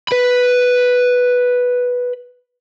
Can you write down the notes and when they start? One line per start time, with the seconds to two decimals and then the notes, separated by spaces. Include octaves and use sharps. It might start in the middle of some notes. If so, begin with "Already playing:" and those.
0.08 B4 B5